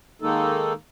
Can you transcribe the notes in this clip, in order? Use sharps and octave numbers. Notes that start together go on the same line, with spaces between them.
D#3 G#3 A#3 D#4 A4